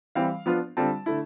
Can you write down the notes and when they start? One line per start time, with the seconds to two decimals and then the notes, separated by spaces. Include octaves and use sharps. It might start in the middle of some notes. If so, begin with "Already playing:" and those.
0.15 E3 G3 C4 F5
0.46 F3 B3 D4 F4
0.77 D3 G3 C4 F4 A5
1.06 D3 A3 E4